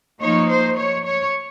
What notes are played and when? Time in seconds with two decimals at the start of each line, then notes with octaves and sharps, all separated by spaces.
0.21 F3 A#3 D#4 C#5
0.49 C5
0.77 C#5
1.06 C#5